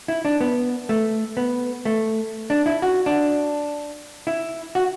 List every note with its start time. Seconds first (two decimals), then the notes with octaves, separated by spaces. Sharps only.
0.08 E4
0.25 D4
0.41 B3
0.89 A3
1.37 B3
1.85 A3
2.50 D4
2.66 E4
2.82 F#4
3.06 D4
4.27 E4
4.75 F#4